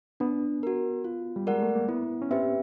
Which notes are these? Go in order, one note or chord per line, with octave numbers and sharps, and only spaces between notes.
B3 D4
F#4 A#4
F4
G3
G#3 A#4 D5 F#5
A3
A#3
B3 E4
C#4
C4 G4 B4 E5